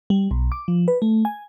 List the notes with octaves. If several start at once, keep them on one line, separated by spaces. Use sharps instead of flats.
G3
B1
D6
F3
B4
A3
G#5